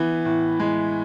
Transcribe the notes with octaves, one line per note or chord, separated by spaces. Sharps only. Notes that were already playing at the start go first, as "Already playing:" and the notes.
Already playing: E3 B3
A2
G#3